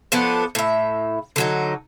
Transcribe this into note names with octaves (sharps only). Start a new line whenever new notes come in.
F3 B3 D4 A4
A2 E5
D3 F#3 D#4